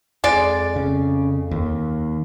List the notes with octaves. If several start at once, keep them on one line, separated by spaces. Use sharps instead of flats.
F2 G#3 D5
C#3
D#2